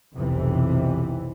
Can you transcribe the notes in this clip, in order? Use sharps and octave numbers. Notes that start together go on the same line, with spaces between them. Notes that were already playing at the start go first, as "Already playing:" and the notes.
F1 B1 F2 C3 E3